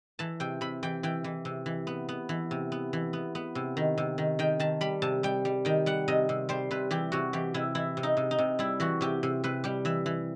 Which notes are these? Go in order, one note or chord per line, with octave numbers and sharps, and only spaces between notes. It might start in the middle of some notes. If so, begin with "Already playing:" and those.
E3 A5
C3 G5
C3 B5
E3 G5
E3 G5
E3
C3
E3
B3
B3
E3
C3
B3
E3
B3
B3
C3
D#3
C3
D#3
D#3 G5
D#3 A5
G3 B5
C3 A5
G3 G5
G3
D#3 G5
G3 F#5
C3 D#5
C3
G3 C5
C3 B4
E3 G4
C3 F#4
E3 G4
C3 E4
E3 E4
C3
D#4
C3
D#4
C3
G3 E4
E3 F#4
C3 G4
C3
C3 B4
G3 G4
E3 E5
E3